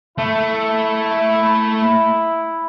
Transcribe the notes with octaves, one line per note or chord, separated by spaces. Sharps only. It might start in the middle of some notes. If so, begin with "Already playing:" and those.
A3 E4